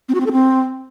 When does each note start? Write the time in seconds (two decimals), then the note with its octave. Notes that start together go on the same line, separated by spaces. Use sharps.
0.09 C4
0.14 F#4
0.20 C4
0.26 A4
0.32 C4